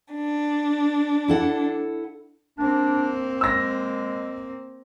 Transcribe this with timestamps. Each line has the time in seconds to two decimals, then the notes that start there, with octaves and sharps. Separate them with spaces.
0.13 D4
1.28 E4 A4 F#5
2.58 A#3 C4 D4
3.41 G#3 E6 A#6